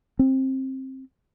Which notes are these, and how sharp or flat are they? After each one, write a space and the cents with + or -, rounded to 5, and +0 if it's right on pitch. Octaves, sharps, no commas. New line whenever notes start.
C4 +20